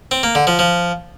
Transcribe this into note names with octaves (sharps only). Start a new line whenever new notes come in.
C4
A#3
D3
F3
F3